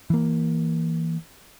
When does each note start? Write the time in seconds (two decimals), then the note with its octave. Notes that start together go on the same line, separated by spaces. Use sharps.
0.10 E3 A#3